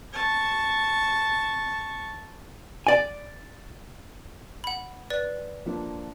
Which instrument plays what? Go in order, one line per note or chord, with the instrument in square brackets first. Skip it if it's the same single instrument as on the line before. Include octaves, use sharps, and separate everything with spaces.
[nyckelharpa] A5 C#6
[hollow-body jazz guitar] D5 G#5
[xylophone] F#5 B5
B4 D5
[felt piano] F3 A#3 D4